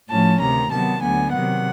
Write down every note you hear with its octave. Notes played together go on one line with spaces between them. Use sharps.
A2 F3 A3 C#4 A5
D2 C3 D#3 A#5
C3 D#3 F#3 B3 A5
D2 D3 F#3 B3 G#5
C3 D#3 F#3 F#5